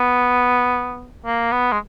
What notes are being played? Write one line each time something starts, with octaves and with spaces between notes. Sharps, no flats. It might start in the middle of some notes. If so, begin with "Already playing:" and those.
Already playing: B3
A#3
B3
G#3